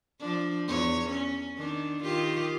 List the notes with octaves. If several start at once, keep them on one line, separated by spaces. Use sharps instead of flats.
F3 D4
E2 C#5
C#4
D#3 D4
D#3 F4 G4